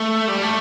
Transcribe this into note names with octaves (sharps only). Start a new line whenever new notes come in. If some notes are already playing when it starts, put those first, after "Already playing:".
Already playing: A3
G3
A3